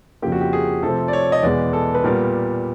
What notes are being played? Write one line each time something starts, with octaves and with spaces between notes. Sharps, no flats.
F2 C#3 F3 A#3 G4
F#4
G4
G#4
C3 F3 A3 C4 A4
D5
C#5
D#5
E2 B2 G#3 B3 D5
A4
B4
A#2 G3 B3 A#4